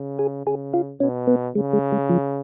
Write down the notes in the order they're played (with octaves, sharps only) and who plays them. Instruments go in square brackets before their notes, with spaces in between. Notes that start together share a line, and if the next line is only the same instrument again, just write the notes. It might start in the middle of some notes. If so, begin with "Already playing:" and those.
Already playing: [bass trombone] C#3
[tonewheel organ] G#4
[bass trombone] C#3 [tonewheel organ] G#4
[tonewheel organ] F4
[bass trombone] B2 [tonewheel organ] C#4
[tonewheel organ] B3
[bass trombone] C#3 [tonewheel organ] G#3
[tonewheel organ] G#3
G#3
F3